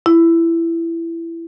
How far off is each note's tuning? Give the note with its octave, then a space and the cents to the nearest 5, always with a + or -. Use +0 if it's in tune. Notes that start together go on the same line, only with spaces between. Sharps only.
E4 +15